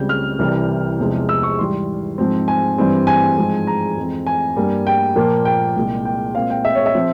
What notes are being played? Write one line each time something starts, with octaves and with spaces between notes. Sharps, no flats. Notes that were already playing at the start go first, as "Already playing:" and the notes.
Already playing: C#2 C#3 G3 C4 G6
F6
C2 C3 E3 G3
E2 C3 F3 G#3 C4
E6
C#6
G#2 E3 G3 C6
G#2 F3 G#3 C4
G#5
G2 E3 G3 C4
G#5
G#2 F3 G#3 C4
A#5
F2 E3 G#3 C4
G#5
G2 G3 A#3
G5
A#2 F3 A#3
G5
C2 A#2 G#3
G5
A#2 G#3 C4 F5
G5
E5
C#5
E5
F3 C4